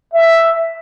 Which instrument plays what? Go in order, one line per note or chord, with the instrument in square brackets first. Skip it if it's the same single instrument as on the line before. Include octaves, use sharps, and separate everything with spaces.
[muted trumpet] E5